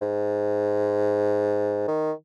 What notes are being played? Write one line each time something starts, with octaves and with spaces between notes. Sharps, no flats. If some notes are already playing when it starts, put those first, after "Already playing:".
G#2
D#3